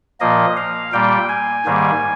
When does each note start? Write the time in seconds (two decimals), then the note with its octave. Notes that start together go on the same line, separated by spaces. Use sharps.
0.20 A#2 F3 A#3 D#5
0.57 F5
0.92 A#2 G3 A#3 G5
1.29 G#5
1.65 G#2 D#3 G3 A#3